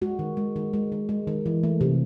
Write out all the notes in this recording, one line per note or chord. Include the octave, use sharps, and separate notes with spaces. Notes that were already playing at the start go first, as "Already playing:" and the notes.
G#3 F#4
D#3
G#3
D#3
G#3
D#3
G#3
D#3
E3
A3
C3